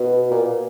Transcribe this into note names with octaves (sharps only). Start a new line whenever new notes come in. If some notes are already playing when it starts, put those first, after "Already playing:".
Already playing: B2
A#2